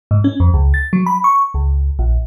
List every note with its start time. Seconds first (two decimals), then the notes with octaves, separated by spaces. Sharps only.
0.11 G#2
0.24 C#4
0.40 F2
0.54 C#2
0.74 A6
0.93 F#3
1.06 B5
1.24 C#6
1.54 C#2
1.99 A#1